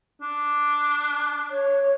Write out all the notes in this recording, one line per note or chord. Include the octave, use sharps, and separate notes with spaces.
D4
C#5